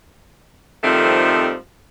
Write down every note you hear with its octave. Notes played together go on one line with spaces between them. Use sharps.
F2 D#3 F3 G3 A3 C4